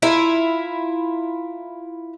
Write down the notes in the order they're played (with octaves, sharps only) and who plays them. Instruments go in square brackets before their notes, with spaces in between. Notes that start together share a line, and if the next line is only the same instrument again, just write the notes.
[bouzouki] E4 F4 A#4